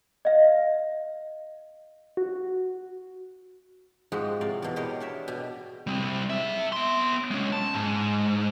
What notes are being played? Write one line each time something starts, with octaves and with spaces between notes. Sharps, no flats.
D#5 F5
F#4
G#2 F3 G#3 F#4 G4
A2 C3 D5 F5
E2 B2
G4 G#4 A#4 C#5 D#5
D4 C#5 E5
B2 G4 G#5
G3 C4
G#4 E5
B3 C6
G#3 C#4
A5
G#2